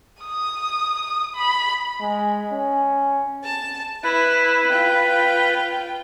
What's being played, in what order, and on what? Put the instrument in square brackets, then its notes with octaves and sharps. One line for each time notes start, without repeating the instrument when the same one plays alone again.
[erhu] D#6
B5
[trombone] G#3
C#4
[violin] A5
[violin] E4 [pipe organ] B4
[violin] F4 G5